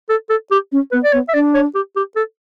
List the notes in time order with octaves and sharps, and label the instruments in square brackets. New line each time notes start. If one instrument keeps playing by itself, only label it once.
[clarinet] A4
A4
G4
[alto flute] C#4
[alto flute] B3 [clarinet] B4
[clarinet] D5
[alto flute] B3 [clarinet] C#5
[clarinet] E5
[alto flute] D4 [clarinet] D5
[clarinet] C#5
G4
G4
A4